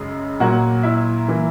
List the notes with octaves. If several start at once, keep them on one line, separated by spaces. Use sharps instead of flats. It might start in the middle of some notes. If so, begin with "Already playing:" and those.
Already playing: F#2 C#3 G#3 G#4
A#2 F#3 A#3 F#4 F#5
E4 E5
E3 A#3